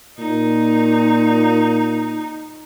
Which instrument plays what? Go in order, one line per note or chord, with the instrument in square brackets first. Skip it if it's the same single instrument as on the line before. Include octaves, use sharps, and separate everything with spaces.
[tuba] A#2 [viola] D#4